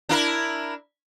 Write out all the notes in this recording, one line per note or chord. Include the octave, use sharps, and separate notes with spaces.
D4 E4 A#4